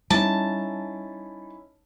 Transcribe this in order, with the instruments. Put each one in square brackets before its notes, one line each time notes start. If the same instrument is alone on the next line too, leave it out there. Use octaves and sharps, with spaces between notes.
[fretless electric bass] G3 [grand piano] C#4 D#4 E4 [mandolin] A5